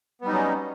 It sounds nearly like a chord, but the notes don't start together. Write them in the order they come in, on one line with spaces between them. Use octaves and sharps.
B3 G3 D#4 F#3 C#4